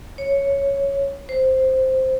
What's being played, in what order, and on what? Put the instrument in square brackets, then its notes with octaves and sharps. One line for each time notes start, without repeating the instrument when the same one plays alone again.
[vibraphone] C#5
C5